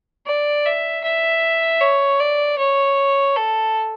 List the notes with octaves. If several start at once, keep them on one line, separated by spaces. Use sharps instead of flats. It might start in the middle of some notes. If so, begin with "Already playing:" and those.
D5
E5
E5
C#5
D5
C#5
A4